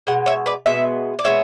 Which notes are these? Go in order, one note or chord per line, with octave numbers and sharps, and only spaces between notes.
B2 G#3 F#5
C#5 E5
B4 D5
B2 G#3 B3 E5
D5
B2 G#3 B3 C#5 E5